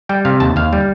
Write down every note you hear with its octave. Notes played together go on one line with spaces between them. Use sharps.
G3 G5
C3 F5
D#2 A5
D#2 F5
G3